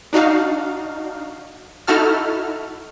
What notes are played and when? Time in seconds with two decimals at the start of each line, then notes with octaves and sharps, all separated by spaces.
0.13 D4 D#4 F#4 F5
1.87 D#4 E4 F#4 A4 F6